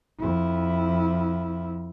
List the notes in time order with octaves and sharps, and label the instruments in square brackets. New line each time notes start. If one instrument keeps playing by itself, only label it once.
[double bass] F2 E4